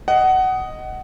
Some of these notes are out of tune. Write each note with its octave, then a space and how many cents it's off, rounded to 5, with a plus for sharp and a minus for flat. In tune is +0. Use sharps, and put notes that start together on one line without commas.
D#5 +0 F#5 +20